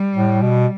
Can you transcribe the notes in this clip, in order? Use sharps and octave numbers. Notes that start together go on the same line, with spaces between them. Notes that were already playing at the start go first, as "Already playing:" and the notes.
Already playing: G3
A2
B2